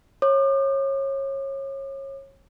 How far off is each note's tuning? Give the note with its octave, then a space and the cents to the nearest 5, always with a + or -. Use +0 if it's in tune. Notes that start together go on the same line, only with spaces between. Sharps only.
C#5 -25 D6 +40